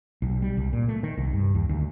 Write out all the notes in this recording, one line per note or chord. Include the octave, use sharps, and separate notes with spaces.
B1
G3
C2
A#2
A3
D#3
C2
G2
D#2
D2